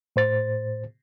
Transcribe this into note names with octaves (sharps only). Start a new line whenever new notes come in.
A2 C5 A6